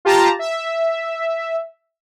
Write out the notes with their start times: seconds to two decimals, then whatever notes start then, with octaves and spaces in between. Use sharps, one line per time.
0.05 F4 G4 A5 A#5
0.39 E5